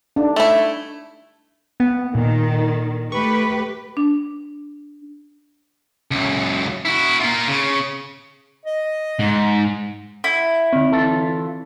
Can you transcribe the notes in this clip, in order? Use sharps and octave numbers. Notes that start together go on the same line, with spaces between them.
D4 D#4
A3 E4
B3
A#2 D#3
A3 G4 B4 C#6
D4
C#2 F#2
E4 F#4
A#3 F4
C#3
D#5
G#2
E4 F#5
D3 C4
E3 F4 A4